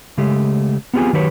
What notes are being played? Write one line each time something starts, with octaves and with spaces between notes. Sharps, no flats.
C#3 G#3 A3 G4
B3 C4 F4 G4 G#4 G#5
D#3 F#3 G4 B4 C#5